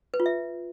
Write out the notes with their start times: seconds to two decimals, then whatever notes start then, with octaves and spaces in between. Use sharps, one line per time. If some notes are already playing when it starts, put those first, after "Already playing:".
0.14 B4
0.20 F4
0.26 E5